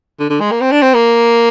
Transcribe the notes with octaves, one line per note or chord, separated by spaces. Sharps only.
D3
D3
G#3
A#3
C4
D4
C4
A#3